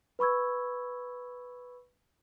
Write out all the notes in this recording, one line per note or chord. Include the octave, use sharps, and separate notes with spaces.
B4 B5 C#6 E6 G#6